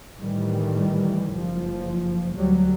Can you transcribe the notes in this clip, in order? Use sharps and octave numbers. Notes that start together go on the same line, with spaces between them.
A2 D#3 E3 G3
F#1 F3
D2 F#3 G3